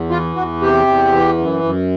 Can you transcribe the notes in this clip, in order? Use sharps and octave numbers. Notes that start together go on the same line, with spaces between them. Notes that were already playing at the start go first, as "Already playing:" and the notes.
Already playing: E2
E3 F4
E2 F#4
C3 G4
E2
E3
F#2
F#2